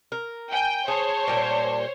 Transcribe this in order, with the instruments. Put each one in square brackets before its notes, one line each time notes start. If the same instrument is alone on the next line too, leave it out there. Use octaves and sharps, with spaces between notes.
[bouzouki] A#4
[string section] G5 [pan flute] G#5
[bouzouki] G#4 [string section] C5 C#5 [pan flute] A5
[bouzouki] A#2 G3 A#3